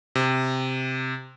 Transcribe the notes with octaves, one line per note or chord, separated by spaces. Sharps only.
C3